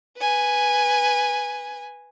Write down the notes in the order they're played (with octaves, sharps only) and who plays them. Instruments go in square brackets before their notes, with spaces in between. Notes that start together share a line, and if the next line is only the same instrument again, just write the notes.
[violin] B4 G#5